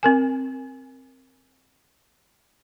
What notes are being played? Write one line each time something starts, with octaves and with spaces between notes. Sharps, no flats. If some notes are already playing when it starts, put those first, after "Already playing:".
C4 A#4 G#5